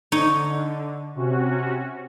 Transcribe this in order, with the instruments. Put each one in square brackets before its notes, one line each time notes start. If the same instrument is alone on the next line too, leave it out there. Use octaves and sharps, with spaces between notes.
[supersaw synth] D3 [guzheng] D#4 C#5
[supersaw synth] C3 C#4 F#4